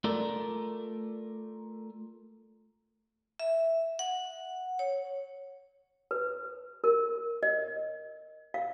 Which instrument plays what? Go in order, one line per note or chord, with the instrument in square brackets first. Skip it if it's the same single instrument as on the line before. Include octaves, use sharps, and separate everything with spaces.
[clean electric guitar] A3 F4 A4 A#4 D5
[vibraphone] E5
F#5
C#5
[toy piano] B4
A#4
D#5
F5